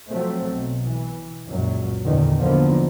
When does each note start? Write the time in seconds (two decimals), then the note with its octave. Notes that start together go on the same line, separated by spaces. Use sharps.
0.11 F3 F#3 A3 C4
0.51 B1
0.84 E3
1.48 C#2 F#2 A#2 F#3
2.03 E2 G2 A#2 D3 D#3
2.39 D3 D#3 F3 F#3 A#3 B3